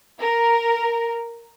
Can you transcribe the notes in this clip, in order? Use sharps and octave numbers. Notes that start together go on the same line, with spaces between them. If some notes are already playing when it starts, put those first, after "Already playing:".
A#4